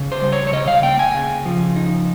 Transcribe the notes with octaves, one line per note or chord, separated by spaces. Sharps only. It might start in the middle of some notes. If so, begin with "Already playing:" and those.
Already playing: C#3
C5
G3
C#5
C#5
C#3 D#5
F5
A#3 G5
G#5
C#3
F3
D#4